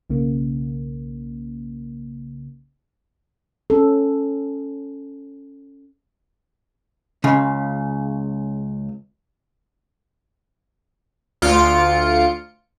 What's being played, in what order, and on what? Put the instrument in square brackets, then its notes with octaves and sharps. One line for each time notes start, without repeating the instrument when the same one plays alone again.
[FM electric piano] B1 C#3 A#3
[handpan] C#4 A4
[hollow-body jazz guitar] C#2 C#3
[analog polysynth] D2 F4 C#7 D7